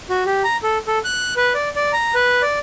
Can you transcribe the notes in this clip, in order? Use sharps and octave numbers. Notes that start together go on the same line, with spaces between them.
F#4
G4
A#5
A4
A4
F#6
B4
D5
D5
A#5
B4
D5